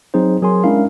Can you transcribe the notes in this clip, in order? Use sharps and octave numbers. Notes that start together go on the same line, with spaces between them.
F#3 C4 D#4 G#4 C5
F#3 G#4 A#4 G#5 C6
G#3 C#4 D4 E4 A#4 F5